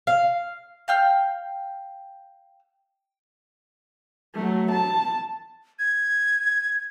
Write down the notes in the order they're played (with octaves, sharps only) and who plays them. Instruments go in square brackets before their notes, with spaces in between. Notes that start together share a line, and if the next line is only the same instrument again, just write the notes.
[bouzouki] F5
[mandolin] F5 G5 F6
[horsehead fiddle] F#3 A3
A5
[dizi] G#6